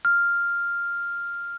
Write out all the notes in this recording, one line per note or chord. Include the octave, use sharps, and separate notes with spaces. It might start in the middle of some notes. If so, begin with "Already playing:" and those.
F6